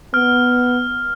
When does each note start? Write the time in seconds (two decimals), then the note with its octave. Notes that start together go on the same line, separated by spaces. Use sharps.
0.14 B3 F6